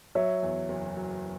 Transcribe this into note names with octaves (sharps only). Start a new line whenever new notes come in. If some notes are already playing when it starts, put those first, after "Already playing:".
F#3 C#5 E5
E2
F#1
F#3